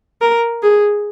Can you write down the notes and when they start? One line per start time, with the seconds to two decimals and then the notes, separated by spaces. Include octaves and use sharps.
0.21 A#4
0.63 G#4